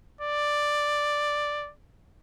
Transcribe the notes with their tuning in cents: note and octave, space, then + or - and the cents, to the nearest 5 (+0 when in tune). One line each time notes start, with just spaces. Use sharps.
D5 +5